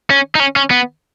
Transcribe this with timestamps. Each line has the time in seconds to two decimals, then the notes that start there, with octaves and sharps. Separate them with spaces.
0.10 C#4
0.35 D#4
0.40 C#4
0.56 C#4
0.71 B3